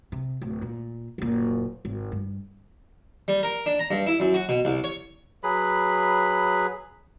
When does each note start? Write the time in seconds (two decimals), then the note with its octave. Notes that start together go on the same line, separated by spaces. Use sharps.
0.12 C3
0.42 D1
0.62 A#2
1.18 F#1 A#2
1.85 G#1
2.12 G2
3.28 G3
3.43 A#4
3.66 D4
3.79 A#5
3.91 G2
4.07 E4
4.20 F#2
4.34 F#4
4.49 B2
4.65 C2
4.84 C#5
5.43 F#3 G#4 B4 B5